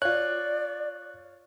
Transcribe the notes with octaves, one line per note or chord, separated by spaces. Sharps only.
F4 C#5 D5 F#6